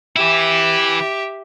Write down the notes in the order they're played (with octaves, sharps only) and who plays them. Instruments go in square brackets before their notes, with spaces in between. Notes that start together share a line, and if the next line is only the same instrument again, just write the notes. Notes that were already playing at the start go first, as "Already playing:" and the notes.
[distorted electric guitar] E3 E4 [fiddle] G4 E5